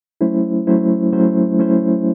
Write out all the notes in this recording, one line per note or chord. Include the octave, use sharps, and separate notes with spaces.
F#3 A3 C#4 E4 C5
F#3 A3 C#4 E4 C5
F#3 A3 C#4 E4 C5
F#3 A3 C#4 E4 C5